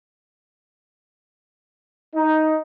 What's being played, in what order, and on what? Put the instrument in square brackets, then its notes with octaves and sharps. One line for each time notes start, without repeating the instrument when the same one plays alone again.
[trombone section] D#4